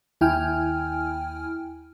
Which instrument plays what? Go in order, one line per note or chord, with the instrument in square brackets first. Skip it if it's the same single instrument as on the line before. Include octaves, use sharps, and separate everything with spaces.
[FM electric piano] D#2 E4 G5 G#5 F6